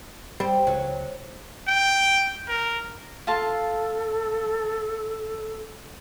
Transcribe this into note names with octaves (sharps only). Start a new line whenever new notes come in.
G3 C4
C#2 F#3
G5
A#4
F4 A4 F5 A5